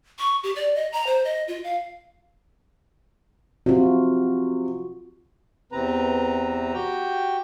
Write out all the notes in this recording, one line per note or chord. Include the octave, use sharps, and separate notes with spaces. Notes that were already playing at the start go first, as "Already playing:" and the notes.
C#6
G4
D5
D#5
A#5
C5
D#5
F4
F5
C3 F4 F#4
E2 C3 C4 B4 A#5
F#4 G4 G5